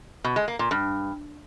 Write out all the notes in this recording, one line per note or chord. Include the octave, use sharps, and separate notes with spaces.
B2
G#3
A#3
A#2
G2